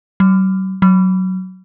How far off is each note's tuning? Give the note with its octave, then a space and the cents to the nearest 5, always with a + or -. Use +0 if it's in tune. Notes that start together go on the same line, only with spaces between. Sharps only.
F#3 +45
F#3 +10